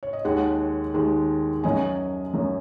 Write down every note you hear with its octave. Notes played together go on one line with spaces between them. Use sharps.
C#5
D#5
D#2 D#3 G#3 C#5 F#5
D#2 D#3 G#3
F#2 F#3 D#5 G#5
F#2 F#3